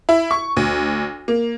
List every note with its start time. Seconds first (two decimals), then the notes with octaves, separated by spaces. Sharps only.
0.09 E4
0.31 C#6
0.57 D2
1.28 A#3